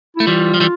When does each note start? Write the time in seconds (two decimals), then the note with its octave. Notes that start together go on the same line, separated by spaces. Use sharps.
0.16 A3 E4
0.27 E3 G3 F4
0.54 F3
0.60 E3 G3